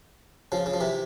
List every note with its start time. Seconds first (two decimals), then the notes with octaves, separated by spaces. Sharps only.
0.52 C#3 F3
0.66 C#3
0.73 F3
0.80 C3 E3